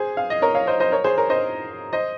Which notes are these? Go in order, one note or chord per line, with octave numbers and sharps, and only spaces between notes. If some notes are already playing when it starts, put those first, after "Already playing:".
Already playing: G#4 C5
F5
D#5
A#4 C#5
C#5 F5
C5 D#5
C5 D#5
A#4 C#5
G#4 C5
A#4 C#5
C5 D#5
C5 D#5